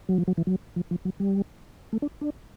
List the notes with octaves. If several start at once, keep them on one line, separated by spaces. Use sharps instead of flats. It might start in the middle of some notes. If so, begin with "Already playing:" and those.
F#3
F3
F#3
E3
F#3
F3
F3
F#3
G3
A3
D4
D4